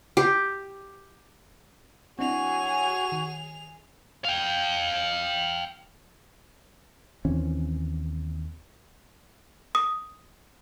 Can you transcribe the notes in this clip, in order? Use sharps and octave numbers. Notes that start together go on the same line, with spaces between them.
G4
F#3 C4 D4 E4 F#4 G#4 G#5 F7
D#3
F5 G5
D#2 E3 C4 C#4
D#6